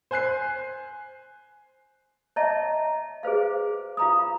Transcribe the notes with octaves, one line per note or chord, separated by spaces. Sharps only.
C5 G#5 F#6 C7
C#5 D#5 E5 A5 A#5
G#4 B4 C5 F5
F4 F5 A#5 B5 D#6